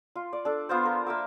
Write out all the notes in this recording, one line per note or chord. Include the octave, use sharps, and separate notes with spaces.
F4
D5
D4 A4
B3 F4 C5
A#4
A#3 E5 D6 E6